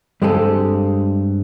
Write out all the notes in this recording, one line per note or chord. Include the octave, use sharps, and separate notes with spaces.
G2 G#3 C4 G4 A4 G#5